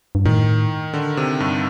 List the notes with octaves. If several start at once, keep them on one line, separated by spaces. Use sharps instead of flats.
G2
A2 D#3
D3
C3
G2